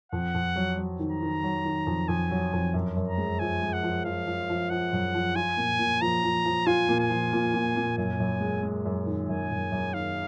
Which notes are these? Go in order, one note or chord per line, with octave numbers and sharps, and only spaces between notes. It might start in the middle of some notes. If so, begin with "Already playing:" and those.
F2 F#5
F2
F#3
F#3
D#3
A#5
D#3
F#3
D#3
F2
F2 G#5
F#3
F2
F#2
F#2
A#5
G#3
F3 G#5
G#3
F#5
F3
F3 F5
F3
F3
F3 F#5
F#2
F3
F4 G#5
A#2
A#2
F3 A#5
F3
F3
F4 G#5
A#2
G#5
F3
A#2
A#2
A#2
F#2 G#5
F#2
G#3
G#3
F#2
D#3
F#2 G#5
F#2
F#2
D#3 F5